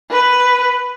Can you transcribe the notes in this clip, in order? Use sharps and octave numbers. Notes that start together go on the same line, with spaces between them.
B4